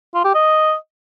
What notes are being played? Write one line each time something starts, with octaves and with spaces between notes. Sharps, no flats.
F4
G4
D#5